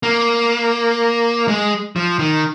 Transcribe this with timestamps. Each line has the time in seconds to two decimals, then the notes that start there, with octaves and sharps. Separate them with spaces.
0.03 A#3
1.48 G#3
1.96 F3
2.19 D#3